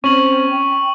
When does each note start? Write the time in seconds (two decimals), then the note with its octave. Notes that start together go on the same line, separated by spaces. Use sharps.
0.04 C4 C#4 C#6 F#7
0.51 G5